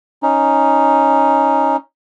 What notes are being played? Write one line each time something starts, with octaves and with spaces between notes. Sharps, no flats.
C#4 D#4